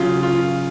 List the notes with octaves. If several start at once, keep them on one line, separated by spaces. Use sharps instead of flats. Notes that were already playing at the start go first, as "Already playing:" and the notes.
Already playing: C#3 F#3 F4
F4